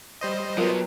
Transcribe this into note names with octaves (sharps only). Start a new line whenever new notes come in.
G3 C5 D#5
F#3 B3 F4 A#4